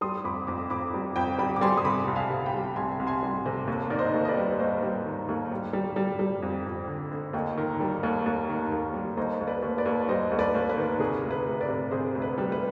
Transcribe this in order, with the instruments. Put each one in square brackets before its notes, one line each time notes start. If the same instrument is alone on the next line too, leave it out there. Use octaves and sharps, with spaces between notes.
[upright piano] G3 C6 D#6
F2 B5 D6
F2 B5 D6
F2 B5 D6
G3
F2 G5 B5
G3 G5 B5
D6
G3 G#5 C6
D#6
C3 B5 D6
C2
F5 G#5
C3
G5 B5
G3
C2 G#5 C6
C2
G#5 C6
G3
C3
D#2
D#3 D5
C5 D#5
D#2
D#5
B4 D5
G3
D#2 C5 D#5
G3
D#3
D#2
G3
G3
G3
G3
F2
F2
D3
D3
D#2 D#5 G5
D#3
G3
D#2
D#2
D#3
D#2
G3
D#2 C5 D#5
D#2
B4 D5
D#2
B4 D5
D#2
G3 C5 D#5
D#2
B4 D5
D#2
B4
D#3
C3 G#4
D2
B4
D2
B4 D5
C3
C3 G#4 C5
D2
B4
G3
B4